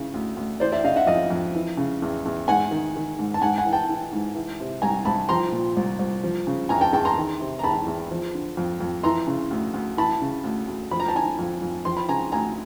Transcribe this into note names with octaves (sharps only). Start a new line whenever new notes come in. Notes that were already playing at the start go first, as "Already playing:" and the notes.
Already playing: C#3 E3
D2
D2
E3 C5 D5
D5 E5
C#3 D#5 F5
E5 F#5
F2 D#5 F5
F2
E3
C#3
E2
E2
G#2 F#5 G#5
D#3
D#3
G#2
A5
G#2 F#5 G#5
F#5 G#5
E3
G5 A5
E3
G#2
E3
C3
C2 G#5 A#5
C2 A5 B5
F3 A#5 C6
A#2
C2
C2
F3
C#3
E2 G#5 A#5
G5 A5
E2 G5 A5
A#5 C6
D#3
C3
A#5
E2 A5 B5
E2
F3
D3
F2
F2
E3 A#5 C6
C#3
D2
D2
E3 A5 B5
C#3
D2
D2
F3 B5
A#5
A5
D3 G#5 A#5
F2
F2
F3 C6
B5
C#3 G#5 A#5
D2 G#5 A#5